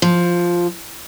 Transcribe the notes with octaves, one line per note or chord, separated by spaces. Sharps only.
F3